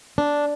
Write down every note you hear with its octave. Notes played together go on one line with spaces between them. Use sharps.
D4